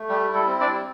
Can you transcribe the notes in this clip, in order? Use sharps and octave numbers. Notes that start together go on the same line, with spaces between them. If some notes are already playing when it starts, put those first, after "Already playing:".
Already playing: A3
G3 G4
E4
A4
C4
D4 D5
G3